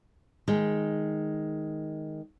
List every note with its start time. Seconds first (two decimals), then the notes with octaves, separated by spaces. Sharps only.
0.48 D#3 G#3